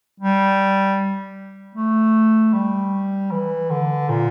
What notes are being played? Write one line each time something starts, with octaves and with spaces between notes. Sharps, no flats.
G3
A3
G3
E3
D3
A#2